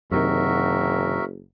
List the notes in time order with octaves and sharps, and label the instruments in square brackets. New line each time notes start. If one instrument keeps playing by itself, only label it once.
[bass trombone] F#1 [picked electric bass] F#2 C3 D#3 [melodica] F#4 A#4 E5